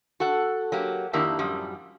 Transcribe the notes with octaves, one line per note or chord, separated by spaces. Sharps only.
F#4 A4 F#5
F#3 A#3 G4
F2 D#3 A#3 D4 E4 G4
F#2 A2 F3 G3